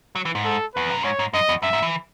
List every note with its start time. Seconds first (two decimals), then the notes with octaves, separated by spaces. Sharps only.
0.15 F#3
0.25 E3
0.35 G#2
0.45 A4
0.74 E2 B4
0.90 F#2
1.04 G#2 C#5
1.19 G#2
1.33 F#2 D#5
1.49 E2
1.62 F#2 E5
1.73 G#2
1.82 E3